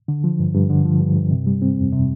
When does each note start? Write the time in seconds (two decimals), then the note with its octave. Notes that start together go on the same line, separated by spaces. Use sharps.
0.08 D3
0.24 F3
0.39 G2
0.54 G2
0.70 D3
0.85 F3
1.00 G2
1.16 G2
1.31 C3
1.47 G3
1.62 C4
1.77 F2
1.92 C3